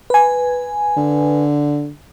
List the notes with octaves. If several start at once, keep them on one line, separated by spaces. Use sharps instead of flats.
B4 G#5
D3